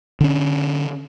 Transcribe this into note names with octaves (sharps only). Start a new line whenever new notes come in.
D3 C#4